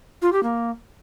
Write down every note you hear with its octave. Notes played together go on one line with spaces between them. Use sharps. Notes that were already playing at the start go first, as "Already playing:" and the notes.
F4
G4
A#3